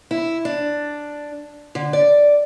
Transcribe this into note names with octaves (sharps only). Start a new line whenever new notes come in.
E4
D4
D3
D5